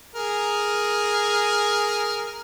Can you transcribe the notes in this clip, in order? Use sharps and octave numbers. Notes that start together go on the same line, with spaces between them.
G#4 A#4